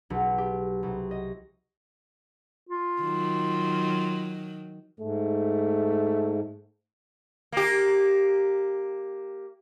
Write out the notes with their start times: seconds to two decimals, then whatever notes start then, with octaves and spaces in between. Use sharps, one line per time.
0.10 B1
0.38 G4
0.83 C2
1.11 D#5
2.69 F4
3.02 D#3 F#3
5.00 G#2 A3
7.52 A#3 G4